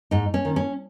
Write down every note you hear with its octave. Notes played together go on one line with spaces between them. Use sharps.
G#2 D#4
C#4
D#3
C#4